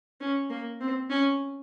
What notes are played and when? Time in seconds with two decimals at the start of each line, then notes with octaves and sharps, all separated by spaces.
0.20 C#4
0.50 A#3
0.80 C4
1.10 C#4